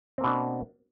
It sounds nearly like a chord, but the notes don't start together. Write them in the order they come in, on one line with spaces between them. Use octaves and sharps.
C4 A#3 B2 D4